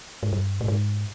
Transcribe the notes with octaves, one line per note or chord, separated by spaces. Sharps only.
G#2
G2
A2
G#2